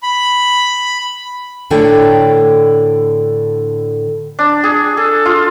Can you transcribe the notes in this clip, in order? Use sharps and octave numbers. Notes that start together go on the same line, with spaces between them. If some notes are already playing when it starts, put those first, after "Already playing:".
B5
A2 D3 D4 A4 C#5 G5
D4
G#4
A4
F4